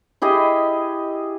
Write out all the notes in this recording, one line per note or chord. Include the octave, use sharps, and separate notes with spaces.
E4 G4 G#4 D#5